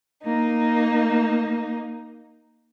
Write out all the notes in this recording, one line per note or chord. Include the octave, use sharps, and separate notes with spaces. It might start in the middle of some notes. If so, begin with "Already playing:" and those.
A#3 D#4